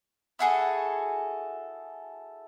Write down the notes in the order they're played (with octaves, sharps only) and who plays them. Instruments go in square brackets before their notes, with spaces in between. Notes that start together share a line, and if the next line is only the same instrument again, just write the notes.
[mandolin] E4 F#4 G#4 A4